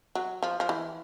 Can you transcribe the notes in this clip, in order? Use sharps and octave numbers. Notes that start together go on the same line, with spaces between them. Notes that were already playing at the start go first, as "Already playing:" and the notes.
F#3
F3
F3
E3